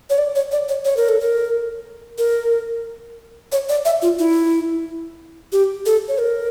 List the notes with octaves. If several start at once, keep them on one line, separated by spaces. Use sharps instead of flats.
C#5
D5
C#5
D5
C#5
C#5
A#4
A4
A#4
A#4
C#5
D5
E5
F4
E4
G4
A4
C#5
A#4